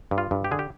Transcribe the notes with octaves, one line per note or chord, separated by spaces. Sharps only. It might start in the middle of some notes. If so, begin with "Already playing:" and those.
G2
F4
G2
G4
D3 G#4
G4